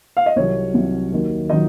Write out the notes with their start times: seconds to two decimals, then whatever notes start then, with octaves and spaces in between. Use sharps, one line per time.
0.17 F5
0.26 D#5
0.36 C2 C3 F#3 C#5
0.74 C2 C3 F#3
1.12 D#2 D#3 F#3
1.50 D#3 F#3 D#4 D#5